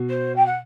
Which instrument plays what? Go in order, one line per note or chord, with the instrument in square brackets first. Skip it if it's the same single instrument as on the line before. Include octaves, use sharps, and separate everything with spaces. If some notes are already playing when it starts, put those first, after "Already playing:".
Already playing: [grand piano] B2
[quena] C5
G5
F#5